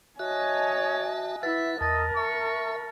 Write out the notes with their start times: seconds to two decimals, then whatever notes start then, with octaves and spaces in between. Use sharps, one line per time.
0.19 F#4 C#5 D#5 E5 G#5 A5 F#6
1.43 E4 B4 E5 F#5 A6
1.81 E2 A#4 D#5 A5 A6
2.17 E5 C#6